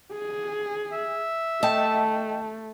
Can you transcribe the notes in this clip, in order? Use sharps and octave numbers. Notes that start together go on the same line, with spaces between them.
G#4
E5
A3 D#5 G5 A5